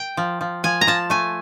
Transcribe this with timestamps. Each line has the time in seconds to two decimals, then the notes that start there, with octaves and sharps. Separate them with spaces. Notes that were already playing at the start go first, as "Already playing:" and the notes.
Already playing: G5
0.17 F3
0.41 F3
0.64 F3 G#5
0.81 A#5
0.87 F3 A5
1.10 A3 G#5